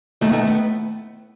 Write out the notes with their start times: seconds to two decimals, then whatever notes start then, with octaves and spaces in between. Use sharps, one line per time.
0.21 D#2 D#3 A3
0.29 B3
0.33 A3
0.47 B3